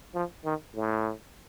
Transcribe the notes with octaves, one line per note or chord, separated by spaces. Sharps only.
F3
D#3
A2